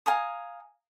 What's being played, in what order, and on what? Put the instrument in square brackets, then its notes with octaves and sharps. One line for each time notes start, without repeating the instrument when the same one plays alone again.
[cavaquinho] F5 G#5 A#5 D#6